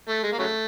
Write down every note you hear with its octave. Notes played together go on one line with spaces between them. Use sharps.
A3
G#3
A#3
C#3 F#3 A3